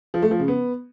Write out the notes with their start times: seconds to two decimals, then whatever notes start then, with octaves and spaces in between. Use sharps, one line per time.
0.14 F3
0.22 A3
0.31 F3
0.40 C#3
0.48 B3